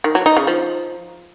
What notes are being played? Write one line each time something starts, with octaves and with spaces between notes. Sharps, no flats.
D#3
F#3
D#4
C#3
F3